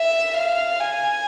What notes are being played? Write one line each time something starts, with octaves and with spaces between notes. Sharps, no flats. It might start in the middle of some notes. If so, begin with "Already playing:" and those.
Already playing: E5
F5
G#5